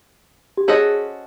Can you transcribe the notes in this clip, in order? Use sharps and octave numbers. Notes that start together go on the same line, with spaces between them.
G4
C#4 F#4 G#4 A4 C5 D#5